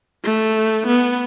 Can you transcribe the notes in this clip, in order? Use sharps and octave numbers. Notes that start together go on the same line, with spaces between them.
A3
B3